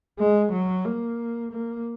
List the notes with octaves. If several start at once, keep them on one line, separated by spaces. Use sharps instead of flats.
G#3
F#3
A#3
A#3